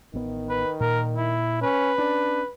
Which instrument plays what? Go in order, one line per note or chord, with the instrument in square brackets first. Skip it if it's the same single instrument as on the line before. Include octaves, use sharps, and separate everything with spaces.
[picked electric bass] A1 B3 [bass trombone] D#3
[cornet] B4
[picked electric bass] A#2 [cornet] A#4
[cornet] E4
[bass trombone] C#4 [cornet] B4
[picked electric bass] C#4 [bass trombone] D4